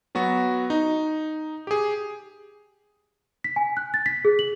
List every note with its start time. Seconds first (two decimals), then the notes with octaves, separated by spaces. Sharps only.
0.15 F#3 B3 F#4
0.70 D#4
1.67 G4 G#4
3.44 B6
3.56 G#5
3.77 F#6
3.94 A6
4.06 B6
4.25 G#4
4.39 F#7